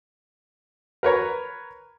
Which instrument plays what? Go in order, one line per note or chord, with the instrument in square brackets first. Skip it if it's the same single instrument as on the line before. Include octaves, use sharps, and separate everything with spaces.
[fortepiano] A#4 B4 C#5 A#5